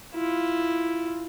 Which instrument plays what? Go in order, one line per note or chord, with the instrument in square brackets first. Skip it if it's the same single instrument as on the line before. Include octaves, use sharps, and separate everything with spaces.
[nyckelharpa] E4 F4